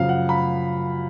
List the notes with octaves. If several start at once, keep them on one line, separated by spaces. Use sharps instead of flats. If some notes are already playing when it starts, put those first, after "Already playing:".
Already playing: F#2 C#3 F3 F5
F#5
B5